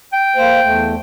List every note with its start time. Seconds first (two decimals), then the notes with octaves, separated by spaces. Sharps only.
0.13 G5
0.36 A#3 C5
0.62 E2 A3